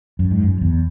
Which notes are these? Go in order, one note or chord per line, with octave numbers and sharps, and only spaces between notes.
F#2
G#2
F#2
E2